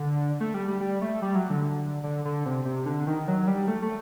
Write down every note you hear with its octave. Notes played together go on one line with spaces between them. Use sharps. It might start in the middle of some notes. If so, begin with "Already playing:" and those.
Already playing: D3
A3
G3
G3
G3
A3
G3
F#3
D3
D3
D3
C3
C3
D3
D#3
F#3
G3
A3
A3